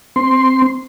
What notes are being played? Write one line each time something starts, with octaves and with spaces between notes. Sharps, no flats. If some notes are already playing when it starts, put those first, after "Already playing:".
C4 C6